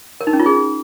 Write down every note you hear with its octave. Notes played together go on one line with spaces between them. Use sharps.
A#4
D#4
C#4
F4
G#4